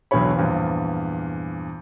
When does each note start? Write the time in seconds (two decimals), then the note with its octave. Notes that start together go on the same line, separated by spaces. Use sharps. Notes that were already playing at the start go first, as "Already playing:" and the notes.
0.11 B1 E2 B2 D3 C#5 B5
0.36 E2 G2 A#2 F3